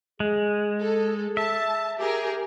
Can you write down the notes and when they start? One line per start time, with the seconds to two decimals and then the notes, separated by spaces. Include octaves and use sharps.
0.20 G#3 G#4
0.82 A4
1.37 E5 A5
1.99 G4 G#4 A#4